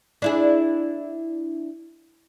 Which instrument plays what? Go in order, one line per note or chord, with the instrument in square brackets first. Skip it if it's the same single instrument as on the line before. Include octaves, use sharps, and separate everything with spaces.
[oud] D4 E4 G#4